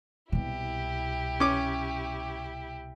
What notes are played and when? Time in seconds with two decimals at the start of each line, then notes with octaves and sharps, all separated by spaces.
0.32 C2 B2 E4 G4
1.40 C#4 D6